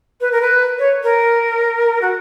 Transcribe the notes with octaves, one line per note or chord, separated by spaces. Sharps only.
B4
A#4
B4
C#5
A#4
F#4